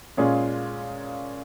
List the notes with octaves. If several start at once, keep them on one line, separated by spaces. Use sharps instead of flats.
A#2 G#3 C#4 F4 G#4